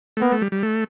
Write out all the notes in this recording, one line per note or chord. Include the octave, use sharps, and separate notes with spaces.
A3
A#3 B3
A3
G3
G3
A3